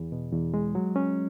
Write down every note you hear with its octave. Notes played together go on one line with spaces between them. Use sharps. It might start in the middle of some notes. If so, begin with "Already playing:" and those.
Already playing: E2
B2
E2
G#3
F#3
C#4